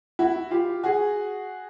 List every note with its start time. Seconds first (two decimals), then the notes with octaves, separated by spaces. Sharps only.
0.19 E4 F#4
0.51 F4 G4
0.84 F#4 G#4